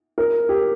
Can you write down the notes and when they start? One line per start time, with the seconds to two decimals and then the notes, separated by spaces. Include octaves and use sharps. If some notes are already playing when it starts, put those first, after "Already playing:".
0.18 A#4
0.49 G4